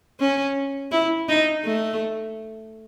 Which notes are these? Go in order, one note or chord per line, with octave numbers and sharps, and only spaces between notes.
C#4
E4
D#4
A3